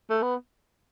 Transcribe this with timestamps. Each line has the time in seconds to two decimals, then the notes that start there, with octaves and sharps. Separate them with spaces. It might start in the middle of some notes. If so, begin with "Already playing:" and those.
0.09 A3
0.22 B3